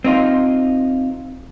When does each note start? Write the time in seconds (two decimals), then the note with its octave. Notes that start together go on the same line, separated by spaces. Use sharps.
0.05 C4 D#4 F4